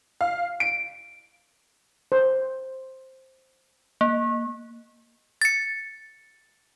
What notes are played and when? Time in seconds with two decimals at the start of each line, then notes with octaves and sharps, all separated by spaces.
0.21 F5
0.60 D7
2.12 C5
4.01 A#3
5.42 A6 C#7